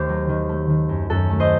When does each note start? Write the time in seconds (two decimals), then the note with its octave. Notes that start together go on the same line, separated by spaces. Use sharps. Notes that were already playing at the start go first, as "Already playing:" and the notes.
Already playing: D#2 D#3 A3 G4 C5
0.09 F#3
0.29 D#3
0.49 A3
0.69 D#3
0.89 F#2
1.10 F#2 F#4 A4
1.29 A3
1.40 C5 D#5